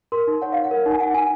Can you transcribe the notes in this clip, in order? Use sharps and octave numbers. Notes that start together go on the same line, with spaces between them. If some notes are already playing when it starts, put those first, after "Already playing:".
A#4 C6
D#4
C#5 F#5
C#5 F5
F#5
A#4
D#4
G#5
A#4 F#5
D#4 G#5